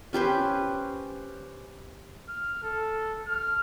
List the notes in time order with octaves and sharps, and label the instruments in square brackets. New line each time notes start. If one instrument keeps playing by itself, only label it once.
[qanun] C#4 G4 B4 C5
[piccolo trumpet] F6
A4
F6